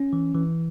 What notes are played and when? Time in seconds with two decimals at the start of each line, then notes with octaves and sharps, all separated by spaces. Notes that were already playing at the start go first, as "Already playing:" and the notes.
Already playing: C#4
0.13 E3
0.34 E3